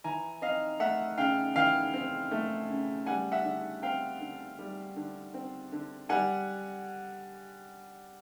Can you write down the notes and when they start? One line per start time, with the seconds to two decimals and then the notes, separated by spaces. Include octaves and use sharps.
0.04 E3 G#5 A#5
0.42 C4 D#5 F5
0.80 A3 E5 F#5
1.18 C#3 F5 G5
1.56 E3 F5 G5
1.94 C4
2.31 A3
2.69 C#3
3.06 G3 F#5 G#5
3.32 E5 F#5
3.45 D3
3.83 C4 F5 G5
4.20 D3
4.59 G3
4.96 D3
5.34 C4
5.72 D3
6.09 G3 F#5 G#5